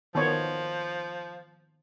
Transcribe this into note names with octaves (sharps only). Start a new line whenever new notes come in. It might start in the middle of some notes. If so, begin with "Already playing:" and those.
D#3 F3 B3 C#5